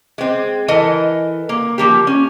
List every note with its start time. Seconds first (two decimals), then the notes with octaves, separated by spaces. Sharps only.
0.18 G#3 C4
0.68 E3 A4 A#4 D#5 G#5
1.49 A#3
1.78 F3 A#3 G4
2.07 C#4